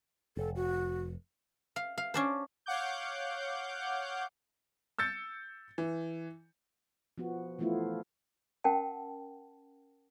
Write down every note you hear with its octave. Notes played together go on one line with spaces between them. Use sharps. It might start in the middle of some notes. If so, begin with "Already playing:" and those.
F1 A4
F#4
F5
F5
C#4 D4 C5
C#5 F5 F#5 D6 G6
E6 G6 A6 C#7
E3
F3 B3 F#4
E3 F3 A3 B3 E4 F4
C#4 A#4 F#5 G5 A5